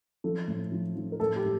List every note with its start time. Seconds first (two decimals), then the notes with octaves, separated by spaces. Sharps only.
0.24 F3 A4
0.48 A2
0.72 F3
0.95 F3
1.12 A#4
1.20 A2 A4
1.36 G4
1.44 A2